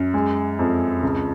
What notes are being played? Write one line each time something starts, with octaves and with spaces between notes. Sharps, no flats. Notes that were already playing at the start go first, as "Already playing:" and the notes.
Already playing: F#2
G#3
F2
C#2